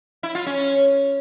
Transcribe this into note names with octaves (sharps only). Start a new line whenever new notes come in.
E4
F4
C#4